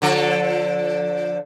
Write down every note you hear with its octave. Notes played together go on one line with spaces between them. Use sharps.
D3 F3 A4